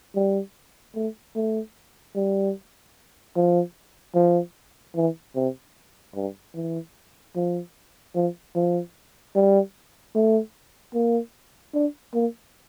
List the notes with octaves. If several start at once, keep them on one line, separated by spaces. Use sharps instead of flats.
G3
A3
A3
G3
F3
F3
E3
C3
G2
E3
F3
F3
F3
G3
A3
A#3
D4
A#3